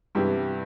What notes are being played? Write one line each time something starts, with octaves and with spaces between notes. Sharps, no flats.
G2 C3 E3 B3 E4 G4